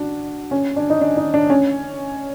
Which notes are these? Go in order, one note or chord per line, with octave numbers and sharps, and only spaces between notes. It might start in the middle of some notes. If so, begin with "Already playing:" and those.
Already playing: D4 F#4
C#4
D4
D#4
D4
D#4
D4
C#4